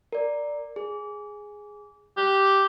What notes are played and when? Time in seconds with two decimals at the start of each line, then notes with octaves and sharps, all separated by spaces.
0.12 A#4 D5
0.76 G#4
2.17 G4 F#6